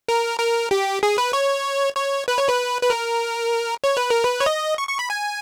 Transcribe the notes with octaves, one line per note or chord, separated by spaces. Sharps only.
A#4
A#4
G4
G#4
B4
C#5
C#5
B4
C#5
B4
B4
A#4
C#5
B4
A#4
B4
C#5
D#5
C#6
C#6
B5
G#5